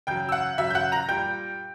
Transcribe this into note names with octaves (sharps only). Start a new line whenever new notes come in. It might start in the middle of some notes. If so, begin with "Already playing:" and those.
C#3 F#3 G5 G6
E6
F#5 F#6
C#3 F#3 E5 E6
G6
F#5 F#6
A#5 A#6
A#2 G3 G5 G6